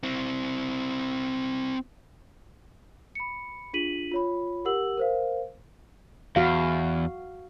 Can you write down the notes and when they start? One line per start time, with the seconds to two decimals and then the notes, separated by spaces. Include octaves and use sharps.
0.03 C4 E4
3.15 B5 C#7
3.73 D4 F4 G#4 B6 D#7 F#7
4.12 F4 C#5 B5
4.65 G4 A#4 F#5 E6 F#7
4.97 A#4 C5 F5
6.36 E2 F#4 F5